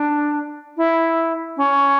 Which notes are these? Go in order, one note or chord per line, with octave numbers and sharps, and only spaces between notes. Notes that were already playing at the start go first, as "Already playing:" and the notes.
Already playing: D4
E4
C#4